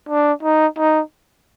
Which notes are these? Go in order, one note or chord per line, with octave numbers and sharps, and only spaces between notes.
D4
D#4
D#4